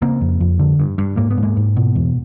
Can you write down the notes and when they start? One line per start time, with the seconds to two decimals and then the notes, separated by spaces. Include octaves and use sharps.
0.02 C#3 A#3 C4
0.21 F2
0.40 F2
0.59 D3
0.80 G2
0.98 G2
1.17 G#2 A#3
1.31 B3
1.37 G#2
1.43 G#3 A#3
1.57 G#2
1.77 B2
1.95 E2